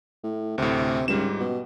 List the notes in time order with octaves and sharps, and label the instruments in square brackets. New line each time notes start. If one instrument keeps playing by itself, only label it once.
[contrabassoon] A2
[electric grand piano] D2 A2 [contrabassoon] C3
[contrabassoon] C#2 [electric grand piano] G#2 G3 E7
[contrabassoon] B2